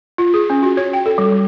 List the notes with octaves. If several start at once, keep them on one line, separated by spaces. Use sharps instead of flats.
F4
G#4
C#4
F#4
C#5
G5
A4
G3
G3